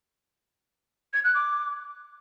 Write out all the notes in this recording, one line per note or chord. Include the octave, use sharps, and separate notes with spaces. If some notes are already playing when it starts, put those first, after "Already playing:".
G#6
F#6
D6